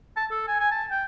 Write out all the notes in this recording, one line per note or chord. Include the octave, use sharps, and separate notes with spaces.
A5
A4
G#5
G#5
A5
G5